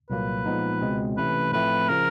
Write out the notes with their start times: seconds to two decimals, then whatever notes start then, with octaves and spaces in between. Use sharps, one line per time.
0.10 C2 A#2 F#3 A#3 B4
0.46 A#2 F3 G#3 B3 D#4
0.81 C#2 B2 G#3 C4
1.17 C3 E3 A3 C#4 B4
1.52 A2 F3 A3 C4 E4 B4
1.88 C#3 F3 A#4